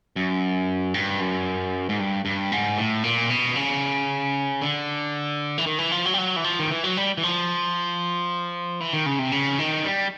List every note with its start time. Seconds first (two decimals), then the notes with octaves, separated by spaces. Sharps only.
0.16 F#2
0.94 G2
1.20 F#2
1.89 G#2
2.00 G2
2.25 G2
2.52 G#2
2.78 A2
3.04 A#2
3.30 B2
3.56 C#3
4.62 D3
5.58 E3
5.66 D#3
5.78 E3
5.92 F3
6.06 F#3
6.14 G3
6.18 F#3
6.36 E3
6.44 F3
6.59 D#3
6.71 E3
6.84 F#3
6.97 G3
7.18 E3
7.23 F3
8.80 E3
8.93 D#3
9.06 C#3
9.19 C3
9.32 C#3
9.59 D#3
9.85 G3